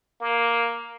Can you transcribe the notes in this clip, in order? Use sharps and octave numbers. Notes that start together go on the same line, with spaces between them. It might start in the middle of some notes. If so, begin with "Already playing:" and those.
A#3